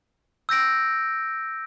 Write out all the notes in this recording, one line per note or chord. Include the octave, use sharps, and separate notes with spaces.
E6 G6 A#6 D7